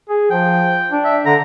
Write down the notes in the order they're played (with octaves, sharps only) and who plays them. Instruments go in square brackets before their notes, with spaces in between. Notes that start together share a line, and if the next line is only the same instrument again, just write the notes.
[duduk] G#4
[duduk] F3 [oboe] G5
[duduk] D4
[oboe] E5
[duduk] D3 [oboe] A#5